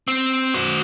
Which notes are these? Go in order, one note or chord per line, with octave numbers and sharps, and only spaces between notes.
C4
F#4 C5